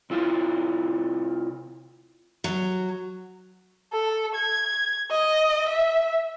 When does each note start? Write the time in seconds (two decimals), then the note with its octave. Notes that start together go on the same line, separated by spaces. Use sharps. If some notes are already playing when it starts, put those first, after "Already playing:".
0.10 C3 E4 F4
2.44 F#3
3.93 A4
4.35 G#6
5.11 D#5
5.68 E5